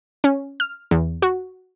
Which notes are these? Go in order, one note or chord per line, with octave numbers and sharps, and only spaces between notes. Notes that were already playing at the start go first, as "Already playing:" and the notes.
C#4
F6
E2
F#4